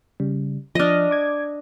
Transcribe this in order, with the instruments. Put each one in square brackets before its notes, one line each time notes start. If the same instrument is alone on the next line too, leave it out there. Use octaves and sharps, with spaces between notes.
[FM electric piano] C#3 G3
[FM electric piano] F3 F6 [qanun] D4 D#5
[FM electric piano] D6 G#6